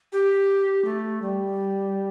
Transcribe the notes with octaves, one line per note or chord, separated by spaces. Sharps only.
G4
A3
G3